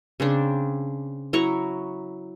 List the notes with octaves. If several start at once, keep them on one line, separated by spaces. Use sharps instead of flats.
C#3 C4 D4
F#3 E4 A#5 C#6